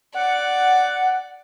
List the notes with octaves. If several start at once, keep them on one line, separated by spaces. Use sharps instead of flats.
D5 F#5